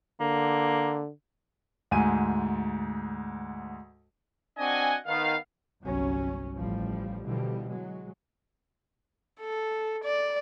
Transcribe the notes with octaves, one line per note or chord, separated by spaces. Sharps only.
D3 A#3
D2 G#2 G#5 D#7
C4 D4 F#4 D#5 F#5 G#5
D#3 B3 F5
G1 C2 F#3 C#4
A1 F3 G3
B2 D3 E3 F3 G3
F#3 G#3
A4
D5